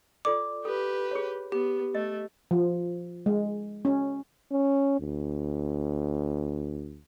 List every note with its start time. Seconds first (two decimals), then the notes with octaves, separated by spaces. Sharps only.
0.25 F4 A4 D5 D6
0.65 G4 A4 B4
1.11 G#4 C#5
1.52 B3 G4
1.95 A3 D#5
2.51 F3
3.26 G#3
3.85 C#4
4.51 C#4
5.00 D2